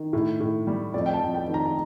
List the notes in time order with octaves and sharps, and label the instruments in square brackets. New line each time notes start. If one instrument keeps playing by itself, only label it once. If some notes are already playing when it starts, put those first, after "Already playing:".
Already playing: [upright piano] D#3
A2
A2
G3
F2 D5
G5
A5
F2
G5
D#3
A#5
A#5